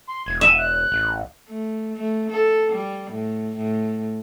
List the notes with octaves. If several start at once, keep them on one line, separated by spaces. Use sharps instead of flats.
C6
E1 G#6
E5 D#7
F#6
A1
A3
A3
A4
G3
A2
A2